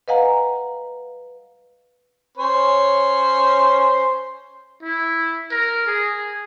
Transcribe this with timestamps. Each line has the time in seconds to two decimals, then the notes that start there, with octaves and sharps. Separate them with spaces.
0.08 B4 D#5 F5 F#5 G#5 A#5
2.38 C#4 C5 C#5
4.83 E4
5.51 A#4
5.87 G#4